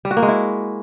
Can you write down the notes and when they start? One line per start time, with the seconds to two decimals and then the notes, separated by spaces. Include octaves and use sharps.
0.05 G3
0.11 F#4
0.17 A#3
0.22 G#3
0.28 E4